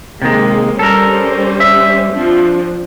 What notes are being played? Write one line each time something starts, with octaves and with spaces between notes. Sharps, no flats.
C3 D#3 G#3 A#3
G3 C#4 A4 A#4 C5
E5
F3 C4 D4